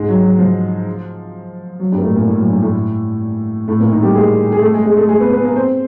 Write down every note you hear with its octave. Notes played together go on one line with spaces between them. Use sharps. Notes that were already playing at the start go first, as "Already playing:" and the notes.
Already playing: G#2 G#3
F#3
F#3
F3
F#3
G2 G3
A#3
A2 A3
A#2 A#3
A2 A3
F#3
G2 G3
A2 A3
A2 A3
A#2 A#3
D#3 D#4
G3 G4
G#3 G#4
G#4
A3 A4
G#3 G#4
G#3 G#4
A3 A4
G#3 G#4
B3 B4
B3 B4
A#3 A#4
C4 C5